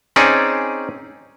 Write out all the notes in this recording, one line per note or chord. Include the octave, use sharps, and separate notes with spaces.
C4 C#4 D#4 G#4 D5